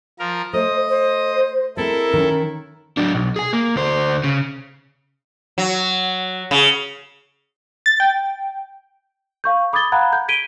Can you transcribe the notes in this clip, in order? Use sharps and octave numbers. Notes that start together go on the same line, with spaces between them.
F3 A#4
A3 C5 D#5
C5
G#3 C4 E4 A4 A#4
D#3 C#4
F#3 D4
B1
G#4 G#5
A#3
D2 C5
C#3
F#3
C#3
A6
G5
F5 C#6 G6
B5 D6 D#6 G#6 A6 G7
F5 F#5 A#5 B5 F#6 G#6
G6
G#6 B6 D7 D#7 G7